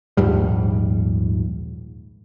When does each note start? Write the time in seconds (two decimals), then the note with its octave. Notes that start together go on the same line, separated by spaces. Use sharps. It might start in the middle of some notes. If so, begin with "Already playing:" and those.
0.17 A#1 D#2 G#2 G3